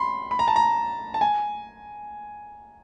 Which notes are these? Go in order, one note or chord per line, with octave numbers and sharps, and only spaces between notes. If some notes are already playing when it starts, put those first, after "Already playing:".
Already playing: B5 C6
B5
A#5
A5
A#5
A5
G#5